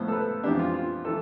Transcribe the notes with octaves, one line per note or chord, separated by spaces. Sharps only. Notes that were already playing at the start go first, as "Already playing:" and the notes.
Already playing: A2 F3 B3 C5
A4
B4
F2 E3 B3 D4 G4
F4
F4
E3 A4